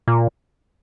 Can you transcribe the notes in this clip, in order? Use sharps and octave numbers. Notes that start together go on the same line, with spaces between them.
A#2